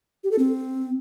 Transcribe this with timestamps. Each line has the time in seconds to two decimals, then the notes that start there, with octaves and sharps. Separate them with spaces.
0.24 G4
0.31 A4
0.39 C4